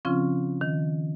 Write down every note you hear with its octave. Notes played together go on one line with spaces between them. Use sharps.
C#3 F3 C4 C#4 F4
D#3